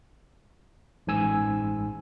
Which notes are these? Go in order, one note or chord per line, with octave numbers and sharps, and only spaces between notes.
A1 G#2 G#5 E6